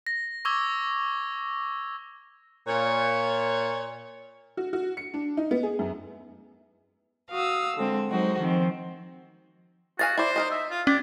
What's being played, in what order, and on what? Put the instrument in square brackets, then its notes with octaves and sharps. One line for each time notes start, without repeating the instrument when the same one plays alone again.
[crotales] A#6
C#6 D6 E6 G#6 G7
[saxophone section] A#2 C#5
[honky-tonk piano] F#4
F#4
C#7
D4
D#4
B3
G#4
F#2
[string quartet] F#4 F5 D#6 E6
D3 G#3 C4
F#3 G#3 D#4 F#4 C5
D#3 F3 C4
[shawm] F#4 [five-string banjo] G#4 F5 G#5 [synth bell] A6
[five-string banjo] E4 D5 [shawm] C5
[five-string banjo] D#4 A#4 D#5
[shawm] E5
F4
[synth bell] C#4 [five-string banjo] G4 [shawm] D5